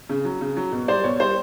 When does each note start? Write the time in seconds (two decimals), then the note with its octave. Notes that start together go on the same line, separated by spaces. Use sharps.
0.09 C#3
0.25 F#3
0.41 C#3
0.57 F#3
0.72 B2
0.88 G3 C5 D5
1.04 B2 C#5
1.20 G3 C5